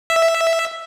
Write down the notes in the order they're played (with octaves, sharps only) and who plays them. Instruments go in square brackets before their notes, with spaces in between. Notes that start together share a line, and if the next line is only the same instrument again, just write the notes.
[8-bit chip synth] E5